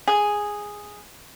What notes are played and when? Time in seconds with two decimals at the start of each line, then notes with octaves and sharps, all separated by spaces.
0.08 G#4